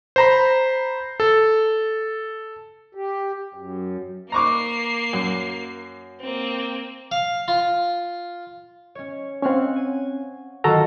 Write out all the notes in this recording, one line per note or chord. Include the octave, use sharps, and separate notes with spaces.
C5 A#5 B5
A4
G4
F#2
A#3 A#5 C#6 D6 C7
F#2
A#3 C4
F5
F4
C#4 C#5
C4 C#4 C#5 F5 F#5
G#5
D#3 F#3 F4 F#4 A4 A#5